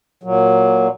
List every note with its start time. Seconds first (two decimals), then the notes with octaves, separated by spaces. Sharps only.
0.23 A#2 F#3